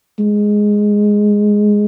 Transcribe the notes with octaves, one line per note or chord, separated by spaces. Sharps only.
G#3